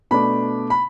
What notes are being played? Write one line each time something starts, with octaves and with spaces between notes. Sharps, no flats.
B2 A3 D4 B5
B5